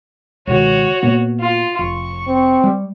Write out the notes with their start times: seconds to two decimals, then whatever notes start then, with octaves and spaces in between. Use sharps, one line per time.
0.47 C#2 B2 D#3 F#4 C#5
1.03 A#2 A#3 B3
1.40 F4
1.79 F1 C#6
2.28 C4
2.64 G3